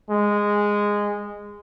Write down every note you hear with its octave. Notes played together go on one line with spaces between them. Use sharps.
G#3